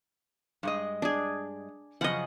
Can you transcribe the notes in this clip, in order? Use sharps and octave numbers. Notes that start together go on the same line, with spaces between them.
G2 G#3 D#5
D4 G#4
F#2 C#3 F3 D#5 F#5